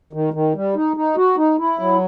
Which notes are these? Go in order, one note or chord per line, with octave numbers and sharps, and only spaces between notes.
D#3
D#3
G3
D#4
D#4
F#4
D#4
E4
F#3